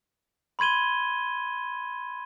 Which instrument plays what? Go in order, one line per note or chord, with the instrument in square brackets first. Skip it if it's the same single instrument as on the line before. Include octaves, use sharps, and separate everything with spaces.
[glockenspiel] B5 C6 G#6 D#7 G7